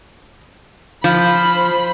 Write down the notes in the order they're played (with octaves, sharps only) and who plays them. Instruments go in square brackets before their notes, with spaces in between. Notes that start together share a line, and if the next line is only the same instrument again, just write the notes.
[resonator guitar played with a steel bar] F3 [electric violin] C5 B5